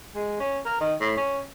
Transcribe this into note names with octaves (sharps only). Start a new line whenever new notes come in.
G#3
C#4
A#4
D#3
A2
C#4